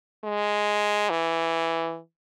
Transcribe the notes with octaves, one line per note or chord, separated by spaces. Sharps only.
G#3
E3